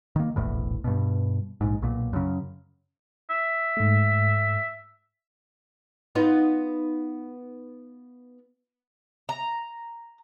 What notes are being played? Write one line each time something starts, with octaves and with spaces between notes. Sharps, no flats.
D#3 A#3
E1 A#1 E2 A2
G2 B2
A#1 G#2
B1 A#2
F#2 C#3
E5
G#2 A3
B3 D#4 F4
A#5